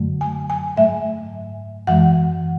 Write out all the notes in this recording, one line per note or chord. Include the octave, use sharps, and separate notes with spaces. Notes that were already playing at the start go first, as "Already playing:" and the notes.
Already playing: F#2 D3 F#3 A3
G#5
G#5
G#2 F#3 A3 E5
F#2 E3 G#3 F#5